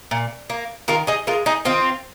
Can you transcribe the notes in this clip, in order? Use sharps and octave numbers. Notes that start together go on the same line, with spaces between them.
A#2
A#3
D#3 F4 A#4
D#4 G#4
G#3 F4 A#4
D#4 G#4
D#3 C4 F4